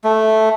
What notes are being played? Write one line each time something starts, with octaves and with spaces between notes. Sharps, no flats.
A3